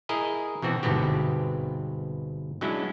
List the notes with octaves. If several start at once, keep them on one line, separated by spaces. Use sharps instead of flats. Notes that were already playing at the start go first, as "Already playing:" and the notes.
E4 G#4 A#4 D#5
B2 E3 C4 F#4
G1 G#2 B2 B3 C4 G4
F#3 G#3 C#4 D4 E4